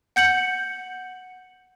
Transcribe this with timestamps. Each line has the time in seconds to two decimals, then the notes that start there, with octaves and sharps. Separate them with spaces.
0.16 F#5 G6 C#7 F#7